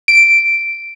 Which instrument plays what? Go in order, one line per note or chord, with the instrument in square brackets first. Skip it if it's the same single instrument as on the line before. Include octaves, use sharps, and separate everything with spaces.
[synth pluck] D7